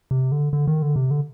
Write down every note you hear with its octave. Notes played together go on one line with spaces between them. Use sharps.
C3
D3
D3
D#3
D3
C3
D3